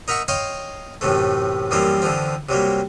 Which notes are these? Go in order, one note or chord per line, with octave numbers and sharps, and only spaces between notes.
D#4 A#4 E5 F#5 C#6
C#5 D#5 F5 G5 C6 C#6
F#2 A2 C3 E3 A3
F#2 E3 F3 G3 A#3 C4
D3 E3 F3 C4
C3 F#3 G3 A#3